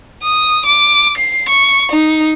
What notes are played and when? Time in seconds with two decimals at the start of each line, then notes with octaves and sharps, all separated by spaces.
0.23 D#6
0.65 D6
1.17 C7
1.49 C#6
1.92 D#4